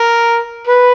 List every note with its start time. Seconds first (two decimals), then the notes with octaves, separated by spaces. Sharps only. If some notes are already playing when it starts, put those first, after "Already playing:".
Already playing: A#4
0.67 B4